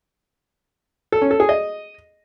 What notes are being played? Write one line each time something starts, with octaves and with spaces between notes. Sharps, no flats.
A4
C#4
A4
G#4
D#5